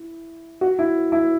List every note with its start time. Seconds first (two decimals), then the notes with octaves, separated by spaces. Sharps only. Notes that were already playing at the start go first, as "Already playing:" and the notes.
Already playing: E4
0.61 F#4
0.79 E4
1.12 E4